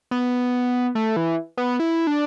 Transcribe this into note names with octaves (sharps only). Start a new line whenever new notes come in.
B3
A3
E3
B3
E4
D4